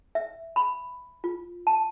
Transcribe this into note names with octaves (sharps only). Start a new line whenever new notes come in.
E5
B5
F4
A5